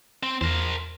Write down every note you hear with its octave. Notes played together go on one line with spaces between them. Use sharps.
C4
E2 A#4 C5